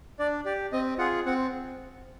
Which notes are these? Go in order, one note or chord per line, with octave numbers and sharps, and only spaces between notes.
D4 D5
G4 D5
C4 D#5
F4 G#4 F#5
C4 F#5